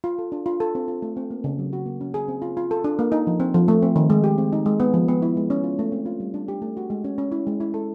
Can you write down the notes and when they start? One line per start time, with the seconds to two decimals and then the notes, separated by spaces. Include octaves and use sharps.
0.04 F4
0.19 A4
0.32 D4
0.46 F4
0.60 A4
0.75 C4
0.88 F4
1.02 A3
1.17 C4
1.31 A#3
1.44 C#3
1.59 F#3
1.73 F#4
1.86 A#3
2.01 C#4
2.14 G#4
2.28 C4
2.42 F4
2.57 F4
2.71 A4
2.84 D4
2.99 A#3
3.12 D#4
3.27 F3
3.40 C4
3.54 F3
3.68 A3
3.82 C4
3.96 D#3
4.10 G#3
4.24 G4
4.38 C4
4.53 D#4
4.66 G#3
4.80 B3
4.94 F3
5.08 B3
5.22 E4
5.37 G#3
5.50 C#4
5.64 F4
5.79 A3
5.92 C4
6.06 F4
6.20 G3
6.34 D4
6.48 G4
6.62 A3
6.77 F#4
6.90 G#3
7.04 C#4
7.18 C#4
7.32 E4
7.47 G#3
7.61 E4
7.74 A4